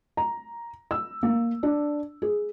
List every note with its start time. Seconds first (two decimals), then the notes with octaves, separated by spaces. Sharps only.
0.17 A#5
0.91 E6
1.23 A#3
1.63 D4
2.22 G#4